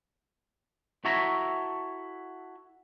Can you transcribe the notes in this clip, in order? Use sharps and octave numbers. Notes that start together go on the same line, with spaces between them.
E4 F#4 A4 C#5 E5 A#5